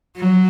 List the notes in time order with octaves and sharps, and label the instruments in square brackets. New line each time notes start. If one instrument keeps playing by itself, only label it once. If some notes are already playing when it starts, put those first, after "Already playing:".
[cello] F#3